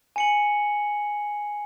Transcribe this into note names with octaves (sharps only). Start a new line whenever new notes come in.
G#5 C#7 F#7